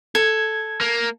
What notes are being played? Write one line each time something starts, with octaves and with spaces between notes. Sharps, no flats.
A4 G#6
A#3